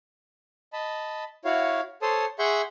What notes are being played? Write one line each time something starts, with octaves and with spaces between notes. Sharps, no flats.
D#5 A5 B5
E4 F#4 C#5 F5
A4 C5 C#5 A5 C6 D#6
G#4 E5 F#5 C6 C#6 G6